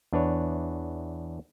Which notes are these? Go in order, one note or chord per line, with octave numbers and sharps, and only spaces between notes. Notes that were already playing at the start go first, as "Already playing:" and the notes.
E2 D4 B4 C#5